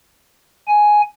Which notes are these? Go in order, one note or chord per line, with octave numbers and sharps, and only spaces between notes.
G#5